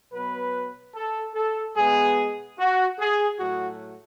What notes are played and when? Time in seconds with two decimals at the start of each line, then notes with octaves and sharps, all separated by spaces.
0.12 B2 F#3 B3 B4
0.93 A4
1.34 A4
1.75 B2 G#3 B3 G#4
2.57 F#4
2.98 G#4
3.39 A2 F#3 A3 F#4